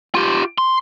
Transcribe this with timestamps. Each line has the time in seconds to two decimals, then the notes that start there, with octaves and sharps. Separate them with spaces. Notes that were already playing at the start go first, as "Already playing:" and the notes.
0.15 F4 G4
0.58 C6